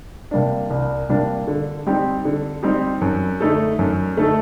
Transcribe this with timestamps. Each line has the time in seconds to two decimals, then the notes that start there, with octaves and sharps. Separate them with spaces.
0.31 C3 G3 A#3 D4
0.70 C2
1.09 C3 G3 A#3 D4
1.47 D3
1.87 G3 C4 D#4 G4
2.25 D3
2.63 G3 C4 D#4 G4
3.01 F#2
3.40 D3 A3 D#4 A4
3.79 F#2
4.17 D3 A3 D#4 A4